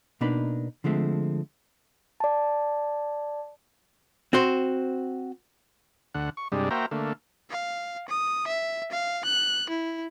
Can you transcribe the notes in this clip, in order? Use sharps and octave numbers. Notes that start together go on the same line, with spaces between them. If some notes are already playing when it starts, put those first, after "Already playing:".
B2 A#3 D4 D#4 B4 B5
D3 F3 G#3 A3 C4
D5 A5
C4 F#4 C5
D2 D3 F#5
C#6
G2 C3 G3 G#3 D4
A#3 F#4 C5 E5 G5 A#5
D3 A3 A#3
F5
D#6
E5
F5
F#6
E4